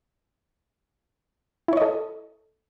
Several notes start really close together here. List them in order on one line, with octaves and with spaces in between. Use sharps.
E4 C#5 D#5 A4